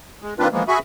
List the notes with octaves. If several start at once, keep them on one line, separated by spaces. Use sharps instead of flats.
G#3
D#3 A#3 C4 D4 F4 B4
E3 F3 G#3 A#3 B3
F#4 G#4 E5 G#5 B5 C#6